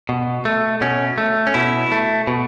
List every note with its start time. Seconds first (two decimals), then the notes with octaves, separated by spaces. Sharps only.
0.09 B2
0.45 A3
0.81 B2 C#4
1.18 A3
1.47 C#4
1.54 B2 E4
1.92 A3
2.27 B2